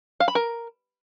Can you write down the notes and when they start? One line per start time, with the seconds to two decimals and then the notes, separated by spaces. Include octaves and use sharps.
0.20 F5
0.28 B5
0.35 A#4